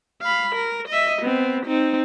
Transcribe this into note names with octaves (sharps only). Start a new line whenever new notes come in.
F5 B5
A#4
D#5 E5
B3 C4
C4 D#4